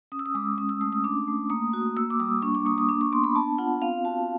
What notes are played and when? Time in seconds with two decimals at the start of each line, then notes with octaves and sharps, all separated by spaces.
0.12 C#4 D#6
0.19 E6
0.26 D#6
0.35 G#3 D6
0.58 C#4 D#6
0.69 E6
0.81 A3 D#6
0.92 D#6
1.04 D4 D6
1.28 A3
1.50 A#3 D#6
1.73 F#4
1.97 A#3 E6
2.10 D6
2.20 G3 D#6
2.42 D4 C#6
2.55 D6
2.66 A#3 D#6
2.78 D#6
2.89 D4 D6
3.01 C#6
3.12 B3 C6
3.24 B5
3.35 B3 A5
3.58 F4 F#5
3.82 C4 F5
4.05 F#4 A5